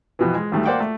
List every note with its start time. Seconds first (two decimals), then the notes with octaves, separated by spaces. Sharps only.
0.19 F2 B2 E3
0.35 G#3
0.52 D2 D#3 G3 A3
0.66 A#3 C5 D5 F#5 G5
0.80 A3